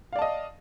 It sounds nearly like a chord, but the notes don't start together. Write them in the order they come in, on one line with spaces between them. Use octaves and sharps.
F5 D5 A5 D#5